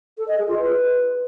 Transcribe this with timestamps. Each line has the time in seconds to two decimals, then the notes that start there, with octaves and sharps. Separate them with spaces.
0.18 A4
0.28 D#5
0.38 G#4
0.48 F4
0.58 B4